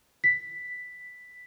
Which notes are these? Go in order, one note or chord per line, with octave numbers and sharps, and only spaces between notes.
B6